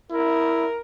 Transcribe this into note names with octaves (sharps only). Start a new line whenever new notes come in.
E4 A#4